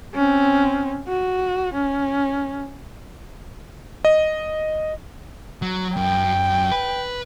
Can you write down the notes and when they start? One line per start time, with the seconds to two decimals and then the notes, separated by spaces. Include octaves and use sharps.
0.15 C4 C#4
1.08 F#4
1.73 C#4
4.05 D#5
5.62 F#3
5.97 F#2 G5
6.71 B4